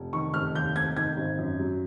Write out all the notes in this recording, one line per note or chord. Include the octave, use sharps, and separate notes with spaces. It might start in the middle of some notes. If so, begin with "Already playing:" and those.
Already playing: F1
D#3 C#6
F1 F6
D#2 G6
F1 G#6
D#3 G#6
G#1
F#2
F#3